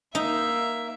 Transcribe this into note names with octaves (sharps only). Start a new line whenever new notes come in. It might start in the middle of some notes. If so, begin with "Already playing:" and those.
A#3 D#4 E5